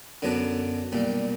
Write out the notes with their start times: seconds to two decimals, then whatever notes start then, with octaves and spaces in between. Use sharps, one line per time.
0.22 F#2 D3 F#3 B3 D4
0.92 B1 A#2 G3